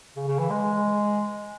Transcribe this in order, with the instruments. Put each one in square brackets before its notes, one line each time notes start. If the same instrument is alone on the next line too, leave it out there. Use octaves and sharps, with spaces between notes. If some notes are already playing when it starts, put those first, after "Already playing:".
[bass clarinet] C#3
C#3
E3
G#3